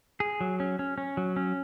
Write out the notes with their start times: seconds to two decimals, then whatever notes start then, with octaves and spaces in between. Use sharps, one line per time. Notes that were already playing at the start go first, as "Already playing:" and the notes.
0.20 G#4
0.41 F#3
0.60 C#4
0.79 C#4
0.98 C#4
1.17 F#3
1.37 C#4